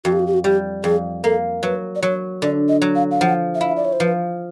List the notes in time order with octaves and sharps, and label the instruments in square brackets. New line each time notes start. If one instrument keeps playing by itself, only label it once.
[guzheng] F2 [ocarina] F#4
[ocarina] G4
F#4
G4
F#4
[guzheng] G3 [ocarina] G4
[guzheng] F2 [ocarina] G#4
[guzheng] A#3 [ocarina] A4
[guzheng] F#3 [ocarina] B4
[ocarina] D5
[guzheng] F#3 [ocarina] C#5
[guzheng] D3 [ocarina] D5
[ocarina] D#5
[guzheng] F#3
[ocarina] F5
F5
[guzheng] F3 [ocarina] F#5
[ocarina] E5
[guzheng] E4 [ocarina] F5
[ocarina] D5
C#5
C5
[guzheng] F3 [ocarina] B4